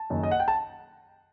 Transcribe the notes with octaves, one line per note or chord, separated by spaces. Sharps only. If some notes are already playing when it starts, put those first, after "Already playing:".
Already playing: A5
F#1 F#2 D#3
D#5
F#5
G5
A5